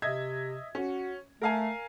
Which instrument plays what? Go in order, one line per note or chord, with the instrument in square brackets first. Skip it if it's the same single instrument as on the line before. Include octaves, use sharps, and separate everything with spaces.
[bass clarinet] C3 [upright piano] D#5 E5 G#6
[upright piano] C#4 [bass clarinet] F#4
[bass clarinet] A3 [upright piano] A#4 F5 G#5